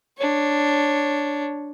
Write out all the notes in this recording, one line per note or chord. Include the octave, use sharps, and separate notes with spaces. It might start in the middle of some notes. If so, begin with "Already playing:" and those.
D4 C#5